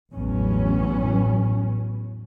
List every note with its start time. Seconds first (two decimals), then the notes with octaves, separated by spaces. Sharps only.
0.13 A1 E2 G2 F#3 B3 C#4